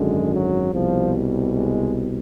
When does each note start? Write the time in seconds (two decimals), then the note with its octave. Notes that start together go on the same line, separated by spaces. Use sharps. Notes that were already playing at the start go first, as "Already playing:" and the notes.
Already playing: G#1 F#2 D3 G#3
0.32 F#3
0.73 C2 B2 F3
1.52 G#3